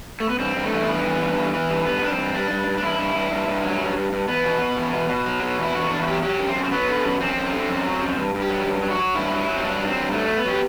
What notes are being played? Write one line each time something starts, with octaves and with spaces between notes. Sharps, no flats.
A3
B3
G2 C4
G2
A3
E3
C4
G2 B3
E3
G2
E3
E3
G2
G2 B3
G2 D4
C4
G2
G2 D4
G2
G2
D4
G2 E4
G2
G2
G2
G2
F#3
G2
G2
G2
E2 B3
B2
B2
E2
B2
B2
F#3
B2
E2 E4
E2 F#4
E2 D4
F#4
F#3 G4
F#3 G4
F#2
C4
F#2
C4
F#3 B3
D3
F#2
F#2 C4
F#2
D3
F#2
F#3
F#2
G2
G2
G4
F#3
G2
F#3
F#4
F#3
G2 E4
F#3
F#3
C4
G2 D4
F#3
C4
G2
F#3 A3
F#3
B3
F#3 G4